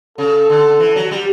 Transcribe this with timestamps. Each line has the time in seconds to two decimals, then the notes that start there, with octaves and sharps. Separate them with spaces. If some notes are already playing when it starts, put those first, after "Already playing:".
0.18 C#3 A4
0.50 D3
0.80 E3
0.96 F#3
1.11 G3